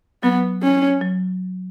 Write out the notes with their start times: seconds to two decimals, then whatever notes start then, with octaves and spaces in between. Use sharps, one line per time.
0.23 F#3 B3
0.63 C#4
1.01 F#3